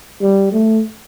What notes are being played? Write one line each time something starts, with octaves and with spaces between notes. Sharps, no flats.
G3
A3